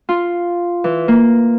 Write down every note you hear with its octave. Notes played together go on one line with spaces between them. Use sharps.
F4
E3
A#3